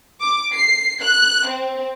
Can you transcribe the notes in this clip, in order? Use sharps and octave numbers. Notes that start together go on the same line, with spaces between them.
D6
C7
F#6
C4